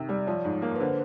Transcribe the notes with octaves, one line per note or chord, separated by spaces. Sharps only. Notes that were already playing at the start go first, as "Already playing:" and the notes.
Already playing: C3 D#3
G3 D5
F3 C#5
G#2
A#3
B4
D3 C5